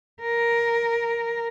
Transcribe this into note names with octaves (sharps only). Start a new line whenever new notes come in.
A#4